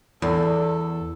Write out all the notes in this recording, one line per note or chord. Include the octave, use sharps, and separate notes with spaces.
E2 A4